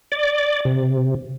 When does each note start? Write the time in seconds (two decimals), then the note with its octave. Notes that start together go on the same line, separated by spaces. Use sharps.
0.12 D5
0.65 C3